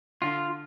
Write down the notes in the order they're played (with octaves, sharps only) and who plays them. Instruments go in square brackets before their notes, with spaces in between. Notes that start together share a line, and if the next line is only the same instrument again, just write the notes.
[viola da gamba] D3 D4 [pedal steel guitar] F4